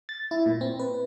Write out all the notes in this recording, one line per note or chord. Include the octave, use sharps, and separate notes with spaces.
A6
E4
A#2
C4
B4